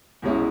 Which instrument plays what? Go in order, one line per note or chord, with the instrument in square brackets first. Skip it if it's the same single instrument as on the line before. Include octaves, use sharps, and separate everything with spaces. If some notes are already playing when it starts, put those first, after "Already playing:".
[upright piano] C2 B2 G#3 C#4 E4